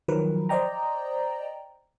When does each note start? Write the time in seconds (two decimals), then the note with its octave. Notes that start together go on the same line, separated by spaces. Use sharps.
0.08 D#3 F3 F#3 A#4 B4
0.49 C5 D5 D#5 G5 A#5